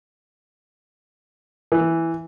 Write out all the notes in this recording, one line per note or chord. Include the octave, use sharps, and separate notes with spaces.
E3